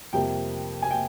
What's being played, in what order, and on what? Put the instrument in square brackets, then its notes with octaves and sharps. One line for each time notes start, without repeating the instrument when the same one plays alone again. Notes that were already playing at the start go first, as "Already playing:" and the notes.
[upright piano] F2 C3 G3 A#3 G5
G#5
G5